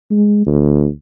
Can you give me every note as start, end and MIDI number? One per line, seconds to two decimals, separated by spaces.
0.11 0.44 56
0.46 0.87 38